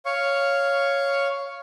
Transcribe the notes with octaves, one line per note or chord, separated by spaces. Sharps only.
C#5 F5 C#6